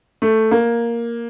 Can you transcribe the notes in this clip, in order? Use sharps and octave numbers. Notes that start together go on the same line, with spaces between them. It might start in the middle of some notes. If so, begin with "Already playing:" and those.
A3
A#3